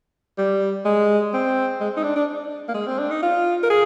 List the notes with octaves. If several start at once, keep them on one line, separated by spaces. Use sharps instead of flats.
G3
G#3
C4
G#3
D#4
D4
D4
A#3
G#3
C4
D4
D#4
F4
A#4
G#4